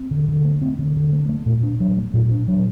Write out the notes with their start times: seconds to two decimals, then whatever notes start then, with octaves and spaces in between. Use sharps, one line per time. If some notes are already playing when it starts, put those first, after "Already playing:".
Already playing: C4
0.11 D3
0.28 D3
0.45 A3
0.62 C4
0.79 D3
0.96 D3
1.13 A3
1.29 A3
1.46 A#2
1.63 D4
1.80 F#3
1.98 A3
2.14 A#2
2.31 D4
2.48 F#3